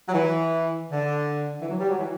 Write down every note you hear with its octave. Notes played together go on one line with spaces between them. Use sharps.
F#3
E3
D3
E3
F#3
G3
F#3
E3